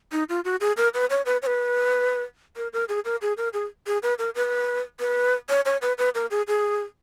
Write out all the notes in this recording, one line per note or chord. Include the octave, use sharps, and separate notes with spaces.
D#4
F4
F#4
G#4
A#4
B4
C#5
B4
C#5
B4
A#4
A#4
G#4
A#4
G#4
A#4
G#4
G#4
B4
A#4
B4
B4
C#5
C#5
B4
B4
A#4
G#4
G#4